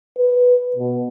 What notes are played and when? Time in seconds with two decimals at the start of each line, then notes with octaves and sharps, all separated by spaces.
0.18 B4
0.76 B2